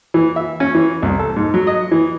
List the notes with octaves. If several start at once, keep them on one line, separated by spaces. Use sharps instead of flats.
E3
E5
C#4
E3
C2
A4
G#2
F#3
D#5
E3